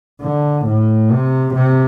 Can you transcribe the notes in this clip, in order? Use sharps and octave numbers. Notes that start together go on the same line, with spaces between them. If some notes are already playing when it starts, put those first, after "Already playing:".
D3
A2
C3
C3